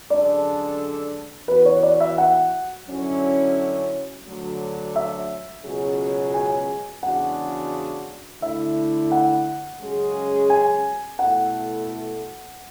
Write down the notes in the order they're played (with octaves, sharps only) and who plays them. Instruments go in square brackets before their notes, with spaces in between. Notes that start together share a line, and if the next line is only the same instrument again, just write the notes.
[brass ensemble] F#2 D3 G#3 D4 A4 [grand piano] D5
[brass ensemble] E3 B3 F#4 [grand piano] B4
[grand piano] C#5
D5
E5
F#5
[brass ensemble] F#2 D3 F#3 C#4 E4
D2 D3 F#3
[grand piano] E5
[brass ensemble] C#2 B2 F#3 C#4 G#4
[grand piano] G#5
[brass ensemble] E2 C#3 G#3 D4 F#4 [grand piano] F#5
[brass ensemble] D3 A3 E4 [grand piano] E5
[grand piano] F#5
[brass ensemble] F#2 C#3 G#3 C#4 G#4
[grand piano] G#5
[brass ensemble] B2 A3 E4 A4 [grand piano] F#5